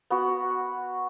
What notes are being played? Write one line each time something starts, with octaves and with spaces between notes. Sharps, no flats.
B3 F#4